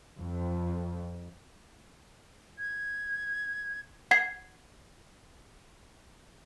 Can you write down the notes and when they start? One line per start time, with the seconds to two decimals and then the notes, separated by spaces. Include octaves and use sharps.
0.18 F2
2.59 G#6
4.11 F#5 G#6 C7